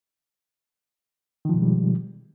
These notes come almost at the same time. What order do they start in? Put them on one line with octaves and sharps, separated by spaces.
D#3 F3 B2 G#3 G3